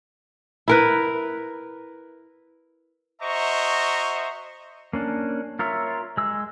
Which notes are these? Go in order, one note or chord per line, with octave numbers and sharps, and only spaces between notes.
E4 A#4 B4
F#4 C5 D#5 E5 A#5 C#6
A#3 C#4 D4
F4 A#4 C#5 E5
G#3 E6